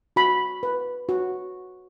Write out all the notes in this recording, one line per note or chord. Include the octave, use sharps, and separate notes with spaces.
F#4 B5
B4
F#4